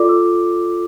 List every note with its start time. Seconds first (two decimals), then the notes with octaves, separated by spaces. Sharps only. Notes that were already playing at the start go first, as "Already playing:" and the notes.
Already playing: F4 A4 D5 D6
0.09 E6